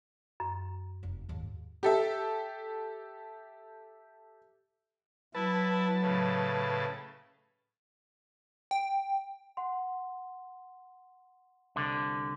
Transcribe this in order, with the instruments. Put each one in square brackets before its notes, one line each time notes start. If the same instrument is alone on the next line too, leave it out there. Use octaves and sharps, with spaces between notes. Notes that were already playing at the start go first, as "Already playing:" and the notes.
[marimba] F#2
[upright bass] F1 D#4
D#2 G#2
[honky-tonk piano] G4 A4 E5
[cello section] F#3 [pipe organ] E4 [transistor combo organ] B4 A5
[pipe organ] A2 C#3
[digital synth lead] G5
[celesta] F#5 C6
[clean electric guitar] C2 D3